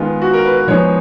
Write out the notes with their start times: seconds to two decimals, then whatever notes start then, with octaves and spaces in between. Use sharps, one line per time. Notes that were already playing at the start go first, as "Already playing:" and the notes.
Already playing: D#3 G#3 B3 F4
0.22 F#4
0.33 A#4
0.45 B4
0.56 B4
0.68 F3 G#3 B3 D#4 C#5